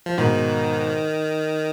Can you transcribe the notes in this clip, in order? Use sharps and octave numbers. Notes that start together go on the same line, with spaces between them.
F3
G#2 B2 D#3